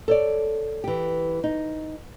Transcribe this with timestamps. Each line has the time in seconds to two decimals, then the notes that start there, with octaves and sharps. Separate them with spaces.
0.08 A4 C#5 D5
0.84 E3 G4
1.44 D#4